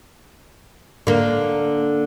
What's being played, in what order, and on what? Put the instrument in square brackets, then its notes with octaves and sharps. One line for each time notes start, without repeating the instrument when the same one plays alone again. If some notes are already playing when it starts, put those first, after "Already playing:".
[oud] D3 A#3